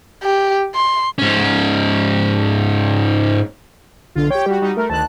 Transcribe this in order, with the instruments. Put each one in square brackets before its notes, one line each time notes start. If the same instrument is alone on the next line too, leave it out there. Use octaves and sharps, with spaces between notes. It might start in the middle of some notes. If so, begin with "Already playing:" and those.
[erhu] G4
C6
[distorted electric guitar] G#2 C#4
[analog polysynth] B1 F4 [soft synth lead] D3
[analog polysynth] G4 G5 [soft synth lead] C#5
[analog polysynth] G3 F#4 [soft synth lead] G4
[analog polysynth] G3 D#4 F#4
[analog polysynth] A3 [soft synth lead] A#4
[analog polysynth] D2 D#3 F#6 [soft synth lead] A5